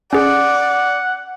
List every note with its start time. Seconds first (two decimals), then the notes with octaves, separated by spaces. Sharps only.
0.13 C#4 G#4 D5 F#5